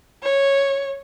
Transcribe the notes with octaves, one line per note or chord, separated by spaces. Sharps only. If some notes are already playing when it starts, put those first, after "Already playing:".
C#5